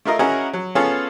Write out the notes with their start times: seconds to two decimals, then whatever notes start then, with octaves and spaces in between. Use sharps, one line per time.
0.05 A3 E4 F4 A#4 D#5
0.19 C#4 E4 F#4 G#4 A#4 D#5
0.53 F#3
0.75 B3 C#4 F4 G#4 A4 C#5